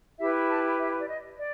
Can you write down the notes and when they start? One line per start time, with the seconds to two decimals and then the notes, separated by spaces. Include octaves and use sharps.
0.18 E4 G4 B4 E5
0.48 A5
0.78 E5
0.99 D5
1.07 D#5
1.38 D5